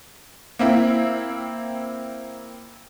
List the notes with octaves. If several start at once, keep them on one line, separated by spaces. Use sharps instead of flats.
A#3 C4 E4